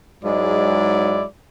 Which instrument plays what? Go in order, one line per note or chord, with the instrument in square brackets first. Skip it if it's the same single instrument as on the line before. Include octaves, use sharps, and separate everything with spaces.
[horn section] G#2 F#3 G#3 E4 D5